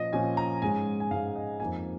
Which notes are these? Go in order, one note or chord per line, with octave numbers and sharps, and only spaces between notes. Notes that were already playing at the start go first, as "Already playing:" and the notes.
Already playing: A#2 F3 C#4 D#5
A#2 F3 C#4 G#5
A#5
G#2 G#3 C#4 G#5
G#5
G#2 G#3 C#4 F5
D#5
F2 F3 A#3 D#4 G#5